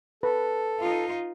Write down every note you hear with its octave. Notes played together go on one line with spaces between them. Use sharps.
A4 B4
D#4 F4